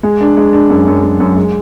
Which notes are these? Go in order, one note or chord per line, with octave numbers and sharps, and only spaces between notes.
G#3
D4
G#3
D4
F#2
F#2
F#2
F#2
G#3